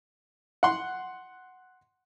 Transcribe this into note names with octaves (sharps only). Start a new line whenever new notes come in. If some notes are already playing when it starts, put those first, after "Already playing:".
F#5 C6